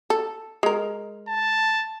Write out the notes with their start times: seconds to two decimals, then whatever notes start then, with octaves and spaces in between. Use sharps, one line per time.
0.10 A4
0.63 G#3 A#4
1.28 A5